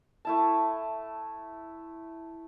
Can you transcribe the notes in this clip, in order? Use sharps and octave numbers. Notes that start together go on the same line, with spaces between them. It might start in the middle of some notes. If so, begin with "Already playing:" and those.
A3 E4 A5